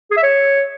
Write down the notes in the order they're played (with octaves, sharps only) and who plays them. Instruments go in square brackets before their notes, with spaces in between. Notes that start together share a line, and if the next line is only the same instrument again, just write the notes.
[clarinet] G#4
E5
C#5